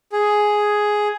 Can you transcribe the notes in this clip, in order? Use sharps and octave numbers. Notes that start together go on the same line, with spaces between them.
G#4